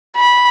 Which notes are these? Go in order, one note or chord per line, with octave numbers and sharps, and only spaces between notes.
B5